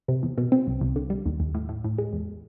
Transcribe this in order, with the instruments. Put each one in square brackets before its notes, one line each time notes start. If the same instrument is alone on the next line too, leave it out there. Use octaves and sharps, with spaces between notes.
[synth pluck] C3
E2
B2
C4
C2
C2
D3
G3
D#2
D#2
A2
A2
A2
G#3
E2